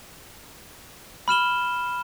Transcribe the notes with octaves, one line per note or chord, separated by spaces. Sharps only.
B5 F6 E7 G7